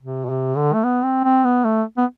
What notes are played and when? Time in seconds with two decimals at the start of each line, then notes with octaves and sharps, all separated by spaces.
0.03 C3
0.25 B2
0.30 C3
0.57 D3
0.74 A3
0.84 B3
1.04 C4
1.24 C4
1.45 B3
1.65 A3
1.98 B3